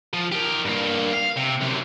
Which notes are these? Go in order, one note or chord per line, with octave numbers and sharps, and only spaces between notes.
F3
G4 A#4
G2 A#3
F5
C3
F#2 C3